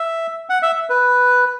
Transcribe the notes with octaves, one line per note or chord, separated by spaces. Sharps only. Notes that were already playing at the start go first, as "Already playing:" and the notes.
Already playing: E5
F#5
E5
B4